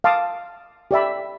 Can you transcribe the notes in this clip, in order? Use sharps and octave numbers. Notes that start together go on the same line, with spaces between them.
F5 A5 C6 D6 D#6
G4 D5 E5 B5